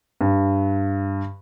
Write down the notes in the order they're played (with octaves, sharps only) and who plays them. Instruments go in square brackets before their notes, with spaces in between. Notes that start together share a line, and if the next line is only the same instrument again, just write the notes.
[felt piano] G2